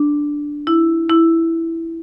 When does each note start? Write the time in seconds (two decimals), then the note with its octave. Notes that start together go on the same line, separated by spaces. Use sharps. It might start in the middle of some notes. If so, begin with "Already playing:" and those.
Already playing: D4
0.67 E4
1.10 E4